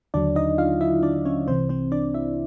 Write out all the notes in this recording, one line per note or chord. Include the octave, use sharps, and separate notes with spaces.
D#2 D3 F#3 D4 D5
D#4 D#5
F4 F5
E4 E5
D4 D5
C#4 C#5
C2 C3 E3 C4 C5
C4 C5
D4 D5
E4 E5